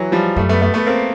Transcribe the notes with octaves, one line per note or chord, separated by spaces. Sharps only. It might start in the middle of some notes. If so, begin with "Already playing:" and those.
Already playing: E3 F#3
F3 G3
F#2 G3 A3
A3 B3
A3 B3
A3 B3
A#3 C4